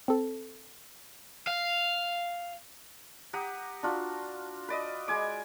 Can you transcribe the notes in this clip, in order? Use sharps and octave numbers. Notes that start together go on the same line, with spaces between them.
C4 A4
F5
G4 F#5 A#5 D#6
D4 F4 F#4
B4 D5 D#5
G#3 G#5 D6